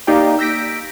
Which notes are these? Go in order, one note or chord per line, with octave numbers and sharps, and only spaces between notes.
A#3 D#4 G4 D5 F5 G5
E6 G6 A#6 B6 D7